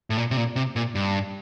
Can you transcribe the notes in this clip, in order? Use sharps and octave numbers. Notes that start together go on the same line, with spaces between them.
A2
A#2
C3
A#2
C3
A#2
G2